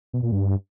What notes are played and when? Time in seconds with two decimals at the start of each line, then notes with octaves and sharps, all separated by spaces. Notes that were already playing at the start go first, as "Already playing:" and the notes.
0.13 B2
0.23 A#2
0.32 G2